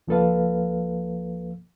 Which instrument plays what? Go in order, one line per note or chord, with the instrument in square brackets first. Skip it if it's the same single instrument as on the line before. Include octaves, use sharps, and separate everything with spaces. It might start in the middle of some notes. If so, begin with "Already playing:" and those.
[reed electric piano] C#2 F3 A#3 A4 B4 F5